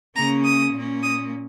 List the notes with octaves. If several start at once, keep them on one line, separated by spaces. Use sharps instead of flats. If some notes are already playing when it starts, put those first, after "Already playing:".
C#3 A#3 C#4 A#5
D#6
A#2 A#3 C#4
D#6